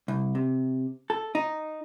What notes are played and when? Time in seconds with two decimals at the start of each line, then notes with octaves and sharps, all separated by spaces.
0.08 C2
0.35 C3
1.10 A4
1.35 D#4